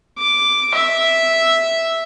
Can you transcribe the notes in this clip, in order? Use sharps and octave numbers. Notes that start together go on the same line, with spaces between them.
D6
E5